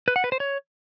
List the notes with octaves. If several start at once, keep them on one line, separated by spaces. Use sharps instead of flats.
B4
F#5
B4
C5
C#5